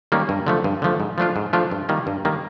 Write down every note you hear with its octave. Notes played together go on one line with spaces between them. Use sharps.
D#3 G3 A#3 C#4
G2
D3 F3 A3
G2
D3 F3 A3
G#2
F3 A3 D4 F4
G#2
F3 A3 D4 F4
G2
D#3 G3 A#3
G2
D#3 G3 A#3